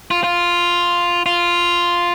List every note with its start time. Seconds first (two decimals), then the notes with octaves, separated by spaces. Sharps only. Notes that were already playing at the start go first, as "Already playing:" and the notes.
0.11 F4
0.24 F4
1.26 F4